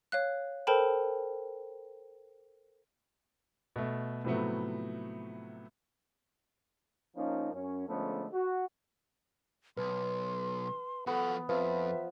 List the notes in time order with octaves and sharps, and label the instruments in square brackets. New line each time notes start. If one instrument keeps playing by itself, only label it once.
[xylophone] C#5 F5 F#6
A4 A#4 C5 G5 A5 B5
[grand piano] B2 A3
A2 C3 F3 F#3 A3 B3
[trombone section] F3 A#3 C#4 D#4
F#2 C#4
D3 F3 G#3 A3 B3 C#4
F#4
[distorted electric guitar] B1 [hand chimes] B4 [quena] C6
[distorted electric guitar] F3 F#4 [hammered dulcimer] B3 [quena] A4
[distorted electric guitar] F2 [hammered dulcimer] F3 [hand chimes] B4 [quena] E5